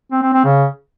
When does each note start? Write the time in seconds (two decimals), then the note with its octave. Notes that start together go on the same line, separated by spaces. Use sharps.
0.12 C4
0.23 C4
0.34 C4
0.45 C#3